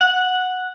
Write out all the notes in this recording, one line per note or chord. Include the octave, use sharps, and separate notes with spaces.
F#5